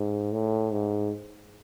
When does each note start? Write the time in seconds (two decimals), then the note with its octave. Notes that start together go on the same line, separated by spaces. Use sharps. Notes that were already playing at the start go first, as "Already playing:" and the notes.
Already playing: G#2
0.32 A2
0.71 G#2